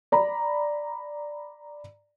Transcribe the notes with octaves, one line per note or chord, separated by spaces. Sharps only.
D5 A#5 B5